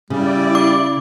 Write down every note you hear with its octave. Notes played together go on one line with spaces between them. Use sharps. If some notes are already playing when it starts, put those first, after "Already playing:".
C#3 G3 E4 D5
D6